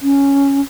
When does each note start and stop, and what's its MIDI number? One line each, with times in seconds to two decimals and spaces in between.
0.01 0.61 61